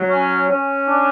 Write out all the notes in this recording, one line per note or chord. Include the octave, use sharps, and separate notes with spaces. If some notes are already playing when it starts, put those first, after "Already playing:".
Already playing: F#3
C#4
C#4
D4